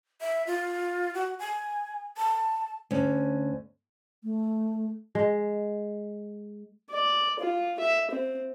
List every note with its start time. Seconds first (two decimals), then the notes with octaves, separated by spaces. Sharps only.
0.21 E5
0.47 F4
1.14 F#4
1.39 G#5
2.17 A5
2.91 D2 C#4
4.24 A3
5.15 G#3
6.91 D5
7.40 F4
7.80 E5
8.11 C4